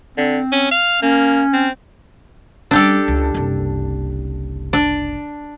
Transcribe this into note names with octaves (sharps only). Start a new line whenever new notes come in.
D3 C4
C#4
F5
A#3 C#4
C4
G3 C#4 D4 G4 A4
C#2
F#1 C2
D4